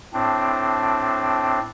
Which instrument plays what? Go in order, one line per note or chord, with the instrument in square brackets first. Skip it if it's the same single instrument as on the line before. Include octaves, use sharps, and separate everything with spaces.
[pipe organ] A2 C4 D4